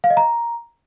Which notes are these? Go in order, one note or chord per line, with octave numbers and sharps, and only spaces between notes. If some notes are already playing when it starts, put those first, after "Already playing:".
F5
D#5
A#5